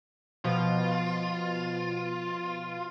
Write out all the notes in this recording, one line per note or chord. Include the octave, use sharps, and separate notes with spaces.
B2 F3 F4